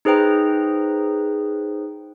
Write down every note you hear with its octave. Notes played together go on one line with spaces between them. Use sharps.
D#4 G#4 B4 C5 G5 A#5